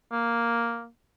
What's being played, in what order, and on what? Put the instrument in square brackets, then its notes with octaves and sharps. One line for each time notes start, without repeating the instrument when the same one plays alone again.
[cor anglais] A#3